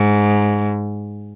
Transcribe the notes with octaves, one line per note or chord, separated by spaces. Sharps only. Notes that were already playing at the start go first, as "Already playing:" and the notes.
Already playing: G#2